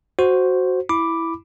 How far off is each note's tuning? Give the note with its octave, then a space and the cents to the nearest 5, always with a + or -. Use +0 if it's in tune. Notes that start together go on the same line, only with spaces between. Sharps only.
F#4 +0 C5 +0
E4 +0 B5 +0 D6 +0